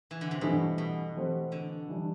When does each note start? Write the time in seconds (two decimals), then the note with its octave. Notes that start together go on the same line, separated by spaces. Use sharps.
0.11 E3
0.21 D3
0.31 C3
0.41 G2 B2 E3 A3 C4
0.78 B2
1.15 E3 A3 C4 G4 C5
1.52 D3
1.89 E3 G3 D4